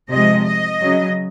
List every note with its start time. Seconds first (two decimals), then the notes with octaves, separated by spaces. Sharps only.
0.11 C3 F3 G#3 D#5
0.46 D#5
0.80 C#3 F#3